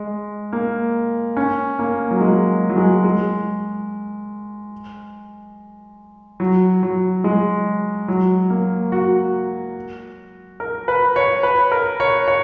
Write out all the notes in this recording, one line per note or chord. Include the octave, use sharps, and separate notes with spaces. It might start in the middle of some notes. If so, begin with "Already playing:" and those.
Already playing: G#3
A#3
C#4
A#3
F#3
G#3
F#3
G#3
G#3
F#3
F#3
G#3
F#3
A#3
F#4
A#4
B4
C#5
B4
A#4
C#5
C#5